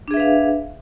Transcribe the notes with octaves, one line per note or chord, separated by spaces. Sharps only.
D4 G#4 B4 E5 F5